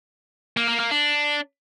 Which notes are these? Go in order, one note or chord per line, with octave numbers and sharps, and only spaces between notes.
A#3
A#3
A#3
D4